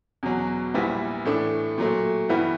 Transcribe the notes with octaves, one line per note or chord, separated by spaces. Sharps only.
E2 B2 F#3
A#1 A#2 G3 B3 E4
A2 E3 A3 D4
A#2 F#3 A3
G2 E3 G3 B3 E4